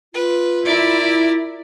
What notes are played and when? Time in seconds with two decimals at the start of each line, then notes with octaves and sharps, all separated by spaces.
0.14 F4 B4
0.65 E4 A#4 D5